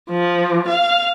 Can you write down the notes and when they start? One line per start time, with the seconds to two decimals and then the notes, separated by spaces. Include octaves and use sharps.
0.10 F3
0.68 F5